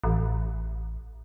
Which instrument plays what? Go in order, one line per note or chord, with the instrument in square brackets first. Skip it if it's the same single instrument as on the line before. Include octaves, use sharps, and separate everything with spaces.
[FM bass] A1